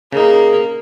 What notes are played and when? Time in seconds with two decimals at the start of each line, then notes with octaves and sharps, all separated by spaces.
0.12 C#3 A#3 D#4 G#4